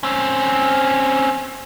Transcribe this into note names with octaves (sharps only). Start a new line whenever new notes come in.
C4 C#4